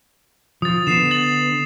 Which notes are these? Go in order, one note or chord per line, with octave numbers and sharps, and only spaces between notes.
F3 D#6 A6
D3 B3 C7 E7
A6 F#7